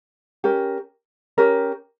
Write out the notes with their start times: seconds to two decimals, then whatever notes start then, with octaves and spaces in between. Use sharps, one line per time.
0.44 C#4 G4 A#4
1.38 C#4 G4 A#4